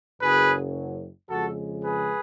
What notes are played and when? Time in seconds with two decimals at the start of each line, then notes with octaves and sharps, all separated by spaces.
0.21 F#1 F#2 C#3 F#3 G#4 B4
1.29 F2 C#3 G#3 F#4 A4
1.83 G#4 B4